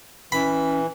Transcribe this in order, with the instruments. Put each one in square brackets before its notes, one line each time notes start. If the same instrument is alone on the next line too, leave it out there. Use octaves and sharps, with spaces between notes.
[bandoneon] E3 [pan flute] C#4 [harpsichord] B5